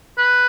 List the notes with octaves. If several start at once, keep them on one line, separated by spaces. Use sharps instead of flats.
B4